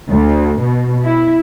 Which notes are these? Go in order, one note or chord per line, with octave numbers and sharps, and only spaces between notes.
D2
B2
E4